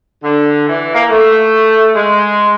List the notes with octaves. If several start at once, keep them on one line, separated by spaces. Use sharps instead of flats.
D3
E3
A#3
A3
G#3